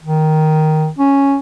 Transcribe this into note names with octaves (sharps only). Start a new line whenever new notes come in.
D#3
C#4